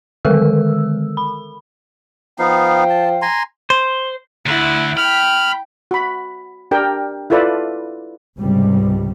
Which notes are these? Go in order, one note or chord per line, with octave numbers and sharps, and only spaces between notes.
D3 D#3 G#3 A4 A#4 E6
B5
F3 B3 D#4 F5 G5
A5
G#5 A#5 C6
C5
D2 E4 F#5
G5 B5 F6
F#4 B5
D4 G4 A#4 G5
E4 F4 A4 B4 D5
C#2 G#2 C3 G3